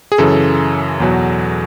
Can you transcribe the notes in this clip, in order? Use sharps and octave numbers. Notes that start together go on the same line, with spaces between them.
G#4
F#2 C#3 E3 A4
E2 B2 F#3